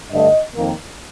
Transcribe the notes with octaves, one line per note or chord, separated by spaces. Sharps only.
G2 D3 A3 D#5
F2 D#3 A#3